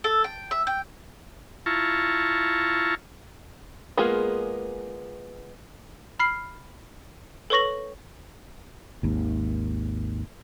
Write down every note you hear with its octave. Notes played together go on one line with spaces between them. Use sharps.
A4
G5
E5
G5
E4 F4 A5 A#5 C#6
G#3 A#3 B3 F4 G#4
B5 F6 C7
A4 B4 C#5 C#6 A#6 F#7
G#1 D#2